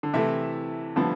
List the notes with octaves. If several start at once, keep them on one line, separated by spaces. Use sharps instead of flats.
D3
C3 E3 A3 E4 A4 E5
A2 D3 F3 G3 B3 E4 B4